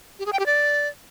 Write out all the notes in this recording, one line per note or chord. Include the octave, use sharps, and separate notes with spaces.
G4
G#4
G5
G4
D5